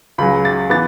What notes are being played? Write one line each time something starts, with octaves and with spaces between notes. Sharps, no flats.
C#2 C#3 F#3 B5
A6
E3 B3 A6